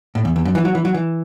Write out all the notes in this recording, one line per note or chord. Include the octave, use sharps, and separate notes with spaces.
A2
E2
E2
F#2
E3
F#3
E3
F#3
E3